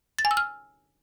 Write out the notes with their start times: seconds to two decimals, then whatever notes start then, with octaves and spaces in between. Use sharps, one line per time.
0.19 A6
0.25 G#5
0.31 E6
0.37 F6